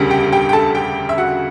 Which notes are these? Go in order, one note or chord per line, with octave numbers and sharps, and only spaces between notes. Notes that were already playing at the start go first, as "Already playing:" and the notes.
Already playing: E1 D2 C#3 G3
G4 G5
G4 G5
G5
A4 A5
G4 G5
E5
F#4 F#5